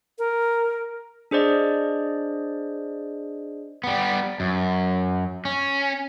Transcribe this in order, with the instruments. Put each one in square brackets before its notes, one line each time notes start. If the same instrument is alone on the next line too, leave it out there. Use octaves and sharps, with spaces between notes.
[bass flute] A#4
[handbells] D4 G#4 C5 D5 D#5
[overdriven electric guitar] G3 B3
F#2
C#4